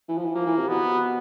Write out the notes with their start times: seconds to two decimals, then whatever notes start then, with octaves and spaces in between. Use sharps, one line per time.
0.08 E3
0.17 F3
0.25 E3
0.34 F3 A#3
0.46 E3
0.58 C3
0.68 B2 B3